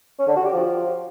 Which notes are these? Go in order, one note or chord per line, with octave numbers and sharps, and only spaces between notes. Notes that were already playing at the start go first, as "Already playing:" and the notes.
C#4
D3
F#4
G4
F3